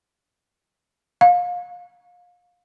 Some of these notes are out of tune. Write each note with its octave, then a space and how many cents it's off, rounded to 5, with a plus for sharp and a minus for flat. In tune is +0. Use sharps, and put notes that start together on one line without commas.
F5 +30